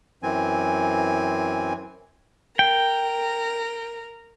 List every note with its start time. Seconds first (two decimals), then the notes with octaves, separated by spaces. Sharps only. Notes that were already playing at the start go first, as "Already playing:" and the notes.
0.23 F#2 E3 C4 G#5
2.59 A#4 G5